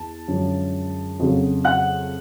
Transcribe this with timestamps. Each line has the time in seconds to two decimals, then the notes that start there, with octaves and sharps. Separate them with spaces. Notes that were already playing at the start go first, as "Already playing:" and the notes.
Already playing: E2 A5
0.28 F#2 D3 F3 G#3
1.19 F2 C#3 F#3
1.65 F#5 F#6